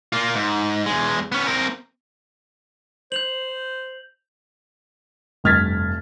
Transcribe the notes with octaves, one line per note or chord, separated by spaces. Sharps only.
A#3 F4
G#2
E2 G#3
B3 C#4
C4 A#4
C5 G6 F7 F#7
F1 G2 F6 G#6 A6 B6